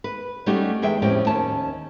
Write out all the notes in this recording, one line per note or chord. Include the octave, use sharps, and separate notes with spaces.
B4
G3 A3 C#4 D#4 F#4 G4
E2 G#3 E5 G5
F2 A2 C#4 G4 G5
D#2 C#4 A5